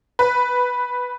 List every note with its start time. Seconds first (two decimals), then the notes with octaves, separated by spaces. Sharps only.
0.19 B4